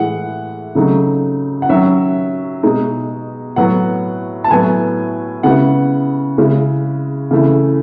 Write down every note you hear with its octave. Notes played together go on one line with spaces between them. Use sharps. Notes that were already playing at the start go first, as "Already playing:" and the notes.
Already playing: A2 E3 G#3 F#5
C#3 F#3 A3 D#4
F#5
D#3 F#3 C#4 E5
B2 G#3 D#4
A2 F#3 B3 F#5
A5
A2 F#3 B3 E4 G#5
C#3 G#3 B3 E4 F#5
C#3 G#3 C#4 E4
C#3 E3 A3 E4